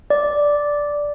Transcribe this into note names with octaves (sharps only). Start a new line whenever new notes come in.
D5